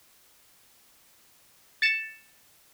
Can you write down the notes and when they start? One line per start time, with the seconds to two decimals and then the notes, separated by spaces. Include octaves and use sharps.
1.82 A6 C#7 E7